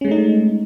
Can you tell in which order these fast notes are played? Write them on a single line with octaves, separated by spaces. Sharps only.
C#4 G#3 A3 D#4